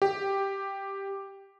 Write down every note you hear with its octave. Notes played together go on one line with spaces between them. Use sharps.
G4